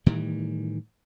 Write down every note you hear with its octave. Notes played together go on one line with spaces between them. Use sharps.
A2 D#3 E3 G3